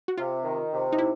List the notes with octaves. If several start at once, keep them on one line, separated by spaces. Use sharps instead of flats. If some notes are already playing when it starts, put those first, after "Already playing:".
F#4
C3 F4
D#3
C3
D#4
E4